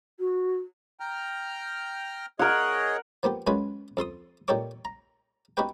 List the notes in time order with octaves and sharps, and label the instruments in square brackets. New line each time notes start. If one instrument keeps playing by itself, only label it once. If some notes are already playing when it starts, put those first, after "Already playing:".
[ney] F#4
[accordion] G5 A#5 F6
[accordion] G#4 C#5 D#5 [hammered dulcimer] A#4 F#5
[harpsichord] F3 A#3 B3 G4
F#2 G#3 F4 F#4 B4 G#5
F2 A4 C6 D#6
A#2 D#4 G4 A4 C#5 D6
A#5
B3 D#4 F#4 G4 B4 G5